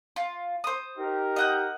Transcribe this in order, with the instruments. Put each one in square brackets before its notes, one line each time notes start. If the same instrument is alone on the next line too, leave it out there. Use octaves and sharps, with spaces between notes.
[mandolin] F4
C5 D#6
[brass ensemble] D#4 G4 A#4
[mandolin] D#5 F#5 G6